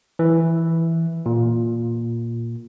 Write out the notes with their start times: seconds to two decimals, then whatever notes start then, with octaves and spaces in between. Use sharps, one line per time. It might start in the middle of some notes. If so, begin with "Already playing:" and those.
0.19 E3
1.26 A#2